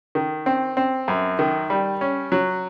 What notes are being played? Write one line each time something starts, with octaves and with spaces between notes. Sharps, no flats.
D#3
C4
C4
F#2
D#3
G3
C#4
F#3